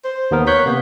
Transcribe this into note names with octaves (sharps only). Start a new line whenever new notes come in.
C5
D#2 B3 A#4
C#5 F#6 G6 B6
C3 A#3 B3